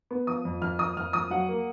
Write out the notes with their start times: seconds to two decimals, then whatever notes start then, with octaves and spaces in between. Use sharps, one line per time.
0.11 B3
0.27 F3 D#6
0.45 F2
0.61 F2 F6
0.79 F2 D#6
0.97 F2 F6
1.13 F2 D#6
1.30 F#3 F#5
1.49 A#3